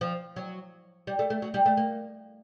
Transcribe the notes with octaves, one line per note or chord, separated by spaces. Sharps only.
F3
F#3
G3
A3
A3
F#3
G3
A3
A#3